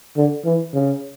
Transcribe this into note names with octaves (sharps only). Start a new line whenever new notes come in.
D3
E3
C#3